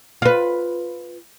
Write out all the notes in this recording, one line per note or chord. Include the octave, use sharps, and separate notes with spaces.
F4 B4